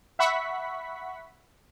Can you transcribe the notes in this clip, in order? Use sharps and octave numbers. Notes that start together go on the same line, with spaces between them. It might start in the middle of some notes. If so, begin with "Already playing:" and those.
E5 F#5 B5 C#6 B6